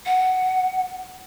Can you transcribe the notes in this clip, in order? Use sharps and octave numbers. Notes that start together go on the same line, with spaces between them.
F#5